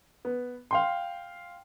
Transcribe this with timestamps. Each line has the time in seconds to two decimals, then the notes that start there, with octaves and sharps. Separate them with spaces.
0.25 B3
0.71 F5 G5 C6